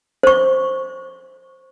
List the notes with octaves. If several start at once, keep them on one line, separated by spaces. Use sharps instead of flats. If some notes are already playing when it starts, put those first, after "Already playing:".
C5 C#6